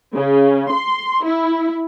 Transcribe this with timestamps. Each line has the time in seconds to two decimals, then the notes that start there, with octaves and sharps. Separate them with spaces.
0.14 C#3
0.70 C6
1.24 E4